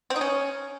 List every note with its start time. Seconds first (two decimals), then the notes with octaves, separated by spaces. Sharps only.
0.10 C4
0.16 D#4
0.21 C#4